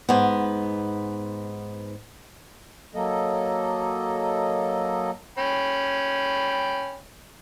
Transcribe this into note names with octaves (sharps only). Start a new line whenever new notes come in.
G#2 B3
F#3 A#3 A4 D#5
C#4 G5 B5